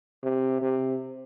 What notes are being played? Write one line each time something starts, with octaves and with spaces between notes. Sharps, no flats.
C3
C3